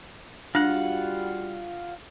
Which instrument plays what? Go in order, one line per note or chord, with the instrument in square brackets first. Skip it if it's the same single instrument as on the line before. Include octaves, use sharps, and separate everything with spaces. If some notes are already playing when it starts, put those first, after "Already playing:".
[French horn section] G3 F#4 [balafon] D4 [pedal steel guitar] F4 F#5